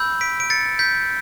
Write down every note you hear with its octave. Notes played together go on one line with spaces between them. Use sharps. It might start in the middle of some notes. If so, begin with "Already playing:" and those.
Already playing: B5 E6 G6
B6 D7
D7
A6 C#7
G6 B6